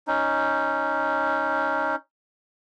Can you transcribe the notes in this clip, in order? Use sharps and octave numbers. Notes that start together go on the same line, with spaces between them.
C#4 D#4